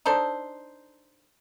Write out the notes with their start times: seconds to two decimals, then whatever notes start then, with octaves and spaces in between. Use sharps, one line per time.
0.06 D4 D#4 A4 C5